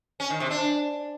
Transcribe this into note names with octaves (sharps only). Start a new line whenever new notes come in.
C#4
D#3
C3
D4